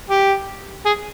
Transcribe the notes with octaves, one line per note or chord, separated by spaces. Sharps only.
G4
G#4